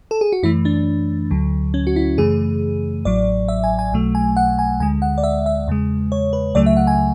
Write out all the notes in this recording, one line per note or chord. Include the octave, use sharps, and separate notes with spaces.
A4
G#4
F#4
F#2 E3 A3 E4
D4
D2 D3 F#3
C#4
F#4
E4
F#2 C#3 E3 A3 G#4
A1 A2 F#3 D5
E5
G#5
G#5
B1 B2 F#3 A3
G#5
F#5
G#5
D2 D3 G#3 G#5
F#5
D5
E5
E5
E2 C#3 G#3
C#5
B4
C#2 C#3 F#3 A3 D5
E5
F#5
G#5